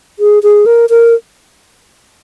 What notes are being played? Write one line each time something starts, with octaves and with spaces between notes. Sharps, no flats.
G#4
G#4
A#4
A#4